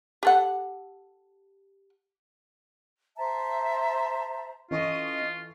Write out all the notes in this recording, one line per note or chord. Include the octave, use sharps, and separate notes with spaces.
G4 A4 F#5
C5 E5 A5 A#5
E3 C#4 F4 A4 D#5 C#6